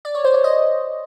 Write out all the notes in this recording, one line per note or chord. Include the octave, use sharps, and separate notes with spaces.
D5
C#5
C5
C#5
D#5